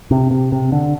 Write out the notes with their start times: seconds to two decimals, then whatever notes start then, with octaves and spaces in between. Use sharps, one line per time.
0.11 C3
0.31 C3
0.52 C3
0.72 D3